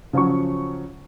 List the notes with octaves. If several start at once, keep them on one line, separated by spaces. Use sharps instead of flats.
C#3 F3 F#3 C#4 C#6